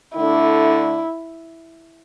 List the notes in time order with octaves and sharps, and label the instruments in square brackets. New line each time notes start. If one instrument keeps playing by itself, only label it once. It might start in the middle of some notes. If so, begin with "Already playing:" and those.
[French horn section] D3 A3 D4 [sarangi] E4